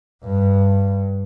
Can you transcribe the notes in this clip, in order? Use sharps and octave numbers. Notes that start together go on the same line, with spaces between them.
G2